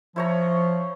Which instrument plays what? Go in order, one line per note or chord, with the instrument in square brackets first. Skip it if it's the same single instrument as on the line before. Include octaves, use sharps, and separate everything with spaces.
[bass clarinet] F3 [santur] E4 C#5 A#5